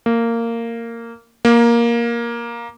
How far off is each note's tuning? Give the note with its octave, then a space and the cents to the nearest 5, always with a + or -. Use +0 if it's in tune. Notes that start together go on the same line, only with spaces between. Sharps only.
A#3 -15
A#3 +10